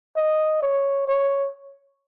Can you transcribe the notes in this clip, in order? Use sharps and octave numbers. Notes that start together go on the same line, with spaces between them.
D#5
C#5
C#5